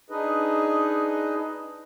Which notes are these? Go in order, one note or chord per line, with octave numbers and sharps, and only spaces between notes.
D4 D#4 G#4 B4 D#5